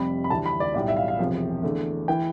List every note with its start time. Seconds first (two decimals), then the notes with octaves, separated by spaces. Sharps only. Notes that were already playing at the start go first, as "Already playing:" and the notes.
Already playing: F1 F2 C3 G3 B5
0.24 B5
0.30 D2 C3 E3 G3 A5
0.46 B5
0.60 D5
0.74 B1 A2 G3 D5
0.88 E5
0.97 F5
1.08 F5
1.19 E1 E2 C3 F3
1.63 E2 D3 A3
2.08 E3 G5